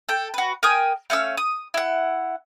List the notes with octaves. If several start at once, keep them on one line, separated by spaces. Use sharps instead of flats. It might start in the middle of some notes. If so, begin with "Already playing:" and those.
A4 G5
F#4 B4
A#4 G5 G#5 D#6
A3 C#4 F5 E6
D#6
E4 F#5